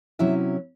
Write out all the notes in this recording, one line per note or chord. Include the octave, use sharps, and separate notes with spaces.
C3 F#3 C#4 E4 E5